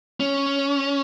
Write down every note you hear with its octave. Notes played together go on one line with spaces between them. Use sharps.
C#4